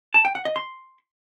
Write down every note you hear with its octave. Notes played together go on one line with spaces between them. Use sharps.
A5
G5
F#5
D#5
C6